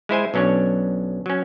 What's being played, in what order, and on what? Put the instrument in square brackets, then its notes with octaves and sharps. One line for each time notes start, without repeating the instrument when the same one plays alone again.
[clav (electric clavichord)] G#3 E4 C5 G#5
B1 F#3 C#4 D4 C#5
F#3 C#4